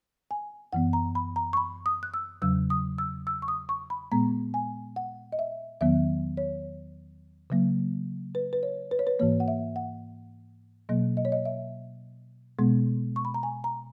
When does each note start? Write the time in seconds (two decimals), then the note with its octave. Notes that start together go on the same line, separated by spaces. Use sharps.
0.31 G#5
0.73 F#2 E3 B3 F#5
0.93 A#5
1.15 B5
1.36 A#5
1.53 C#6
1.57 B5
1.86 D#6
2.03 F#6
2.14 E6
2.42 E2 C#3 F#3 E6
2.70 D#6
2.98 E6
3.27 E6
3.42 C#6
3.48 D#6
3.69 C#6
3.90 B5
4.12 A#2 G#3 B3 A#5
4.54 G#5
4.96 F#5
5.32 D#5
5.39 E5
5.81 E2 D#3 F#3 B3 E5
6.37 C#5
7.50 C#3 F#3 A#3
8.35 B4
8.53 B4
8.63 C#5
8.91 B4
8.99 C#5
9.07 B4
9.19 G#2 E3 A#3 C#5
9.40 F#5
9.48 E5
9.76 F#5
10.89 B2 F#3 A#3 D#5
11.17 D#5
11.25 C#5
11.32 D#5
11.45 E5
12.59 B2 G#3 B3
13.16 C#6
13.25 B5
13.34 A#5
13.43 G#5
13.64 A#5